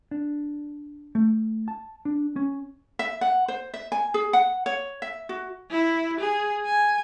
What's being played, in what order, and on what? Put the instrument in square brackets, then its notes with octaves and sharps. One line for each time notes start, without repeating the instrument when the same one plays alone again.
[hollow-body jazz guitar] D4
A3
A5
D4
C#4
[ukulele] E5
F#5
C5
E5
G#5
G#4
F#5
C#5
E5
F#4
[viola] E4
G#4
G#5